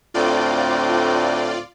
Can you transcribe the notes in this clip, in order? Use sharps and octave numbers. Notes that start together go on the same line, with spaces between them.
D2 A2 C4 F4 D5